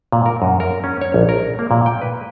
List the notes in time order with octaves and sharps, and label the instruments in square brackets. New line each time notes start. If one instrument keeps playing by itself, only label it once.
[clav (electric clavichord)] A#2
A#4
F#2
A#4
C#4
C#5
A#1
A#4
A#3
A#2
G5
B4